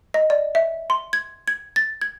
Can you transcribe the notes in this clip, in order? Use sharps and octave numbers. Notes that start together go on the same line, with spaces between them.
D#5
D5
E5
C6
G#6
G#6
A6
G#6